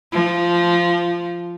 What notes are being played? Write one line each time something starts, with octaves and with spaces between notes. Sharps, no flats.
F3